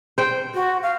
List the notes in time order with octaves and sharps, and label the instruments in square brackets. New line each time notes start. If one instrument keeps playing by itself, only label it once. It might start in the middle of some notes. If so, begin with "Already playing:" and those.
[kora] C5 G5
[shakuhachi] F#4
F5